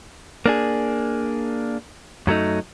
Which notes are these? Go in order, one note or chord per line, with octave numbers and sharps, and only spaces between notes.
A#3 D4 G#4
F#2 F#3 A3 D#4